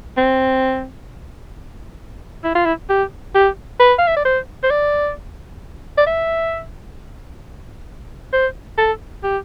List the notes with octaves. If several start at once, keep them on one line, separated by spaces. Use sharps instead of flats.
C4
E4
F4
E4
G4
G4
B4
F5
E5
D5
C5
C5
D5
D5
E5
C5
A4
G4